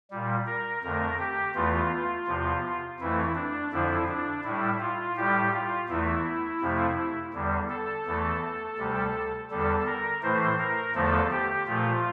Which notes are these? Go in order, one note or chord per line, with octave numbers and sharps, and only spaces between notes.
A#2 G3
A#4
F2 D3 A3 A#4
G4
E2 E3 A3 F4
E2 C3 F3
F2 E3 A3 E4
D4
F2 D3 F3 E4
D4
A2 G3 E4
F4
A2 G3 G4
F4
E2 E3 A3 E4
F2 C3 F3 A3
E2 D3 G3
A4
E2 E3 A3
D2 C3 G3
E2 D3 G3 A4
A#4
A2 E3 A3 C5
A#4
E2 D3 F3 A3 A4
G4
A#2 F3 A3 F4